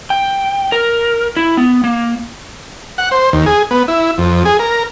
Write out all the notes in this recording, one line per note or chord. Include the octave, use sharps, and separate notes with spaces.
G5
A#4
E4
B3
A#3
F#5
C5
D#2
G#4
B3
E4
F2
G#4
A#4